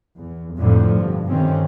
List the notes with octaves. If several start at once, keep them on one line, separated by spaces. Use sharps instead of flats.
E2
F2 A2 D3 F3
G2 B2
G2 D3 D#3 C4 C#4